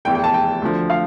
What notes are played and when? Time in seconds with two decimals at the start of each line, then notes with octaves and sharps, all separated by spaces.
0.05 F1 E2 E3 G5
0.15 G5
0.24 A5
0.34 G5
0.62 D2 D3 F3
0.90 F5